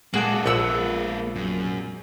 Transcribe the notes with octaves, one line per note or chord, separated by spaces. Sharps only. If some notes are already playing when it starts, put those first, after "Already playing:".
A#2 G#3 A#3 F#4 G#4 A4 D5 F#5
A#1 B3 F#5 E6
F#2